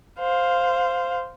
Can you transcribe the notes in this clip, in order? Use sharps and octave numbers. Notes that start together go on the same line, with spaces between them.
C5 F5